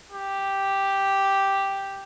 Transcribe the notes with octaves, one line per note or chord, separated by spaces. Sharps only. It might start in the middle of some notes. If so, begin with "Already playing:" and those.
G4